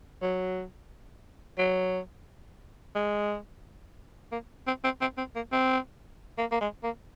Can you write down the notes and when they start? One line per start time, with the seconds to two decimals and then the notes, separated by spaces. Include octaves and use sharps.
0.22 F#3
1.59 F#3
2.95 G#3
4.32 A#3
4.67 C4
4.84 C4
5.01 C4
5.18 C4
5.36 A#3
5.52 C4
6.38 A#3
6.51 A#3
6.61 G#3
6.83 A#3